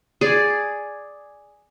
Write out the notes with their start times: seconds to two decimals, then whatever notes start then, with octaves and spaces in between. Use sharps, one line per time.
0.21 G#4 D5